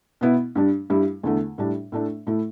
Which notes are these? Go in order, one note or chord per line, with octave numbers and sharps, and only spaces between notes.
B2 B3 E4
G2 G3 D4
G2 G3 E4
E2 D3 A3
A2 G3 D4
A2 A3 D4
A2 A3 E4